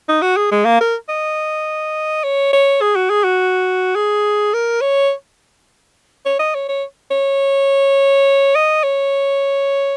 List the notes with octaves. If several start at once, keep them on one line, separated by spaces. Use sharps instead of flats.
D#4
F#4
G#4
G#3
A#3
A#4
D#5
C#5
C#5
G#4
F#4
G#4
F#4
G#4
A#4
C#5
C#5
D#5
C#5
C#5
C#5
D#5
C#5